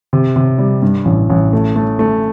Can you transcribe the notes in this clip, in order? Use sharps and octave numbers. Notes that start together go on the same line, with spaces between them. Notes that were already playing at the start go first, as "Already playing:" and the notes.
C3
C3
G3
G2
A1
A1
A3
A3
A3